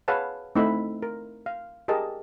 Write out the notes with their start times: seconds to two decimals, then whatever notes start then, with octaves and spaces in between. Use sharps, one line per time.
0.08 G#4 B4 C#5 F5 F#5 A5
0.55 A3 C4 D#4 E4 E5 B5
1.03 A#4
1.46 F5
1.88 G4 G#4 A#4 D#5 A5